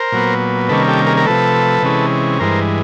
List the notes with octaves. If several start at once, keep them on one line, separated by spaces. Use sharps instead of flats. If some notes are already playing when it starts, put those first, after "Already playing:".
Already playing: A#4 C5
A#2 F#3 B3
C3 D#3 G3 A#3 C#4 A4 B4
G4 A4
G#4 A#4
A#4
C3 F3 A3 A4 B4
C3 E3 G#3 C#4
G2 E3 G#3 A#4 C5